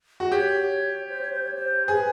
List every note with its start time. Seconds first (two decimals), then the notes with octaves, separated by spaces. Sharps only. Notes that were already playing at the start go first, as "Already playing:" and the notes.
0.20 F#4
0.31 G4 C#5
1.09 C5
1.21 C#5
1.32 C5
1.43 C#5
1.54 C5
1.87 G#4 B4